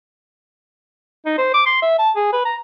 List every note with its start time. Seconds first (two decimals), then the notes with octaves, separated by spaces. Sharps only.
1.26 D#4
1.38 C5
1.54 D6
1.66 C6
1.82 E5
1.99 A5
2.16 G#4
2.33 B4
2.45 A#5